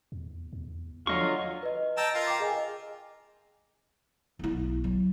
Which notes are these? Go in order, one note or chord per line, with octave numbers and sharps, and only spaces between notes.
E2
E2
D3 F3 F#3 F4 D#5 F5 C#6
B4 D#5
D#5 G5 A5 A#5 E6
F4 A#4
G5 D6
G#4 D#5 G#5
B1 E4
F#3